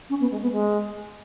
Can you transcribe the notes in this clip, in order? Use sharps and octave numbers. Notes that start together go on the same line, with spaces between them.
C#4
B3
G#3
B3
G#3